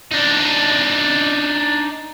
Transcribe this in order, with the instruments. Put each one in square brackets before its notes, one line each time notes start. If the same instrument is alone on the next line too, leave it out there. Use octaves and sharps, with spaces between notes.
[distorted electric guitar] D4 D#4